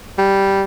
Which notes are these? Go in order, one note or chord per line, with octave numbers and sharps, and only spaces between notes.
G3